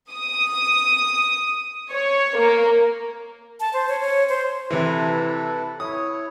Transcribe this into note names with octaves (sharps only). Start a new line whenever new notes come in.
D#6
C#5
A#3
A5
C5
C#5
C#5
C5
C3 E3 E4 A4 B4
E4 C#5 D#6